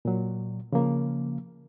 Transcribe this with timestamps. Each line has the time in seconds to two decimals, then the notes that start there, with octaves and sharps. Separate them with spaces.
0.05 A#2 F#3
0.72 C#3 F3 A#3